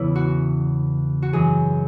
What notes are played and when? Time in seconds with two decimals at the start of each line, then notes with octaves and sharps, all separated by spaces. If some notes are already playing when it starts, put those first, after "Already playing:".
Already playing: E2 C#3 E3 B3 C#4 E4
0.15 F#4
1.22 F#4
1.33 F#2 E3 G#4